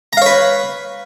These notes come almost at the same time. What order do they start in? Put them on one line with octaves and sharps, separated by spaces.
A#5 F5 C#5 B4